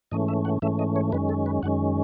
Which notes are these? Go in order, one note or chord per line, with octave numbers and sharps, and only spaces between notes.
G#2 E3 A3 C#4 D#5
E5
F#5
G#2 E3 A3 C#4 E5
D#5
C#5
F#2 D#3 G#3 C#4 B4
A4
B4
F#2 D#3 G#3 C#4 F#5